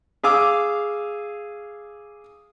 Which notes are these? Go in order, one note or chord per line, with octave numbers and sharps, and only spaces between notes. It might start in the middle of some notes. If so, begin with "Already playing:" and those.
G#4 F5 D6 E6